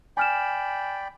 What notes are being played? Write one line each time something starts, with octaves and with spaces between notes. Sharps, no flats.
D5 G5 G#5 B5 F6 E7